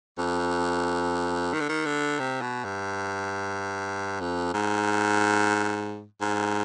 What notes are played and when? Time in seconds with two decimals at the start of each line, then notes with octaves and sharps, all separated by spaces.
0.18 F2
1.53 D#3
1.60 D3
1.69 D#3
1.86 D3
2.19 C3
2.42 B2
2.65 G2
4.20 F2
4.54 G#2
6.21 G#2